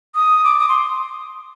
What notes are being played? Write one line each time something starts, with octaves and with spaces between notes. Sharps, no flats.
D#6
D6
D#6
C6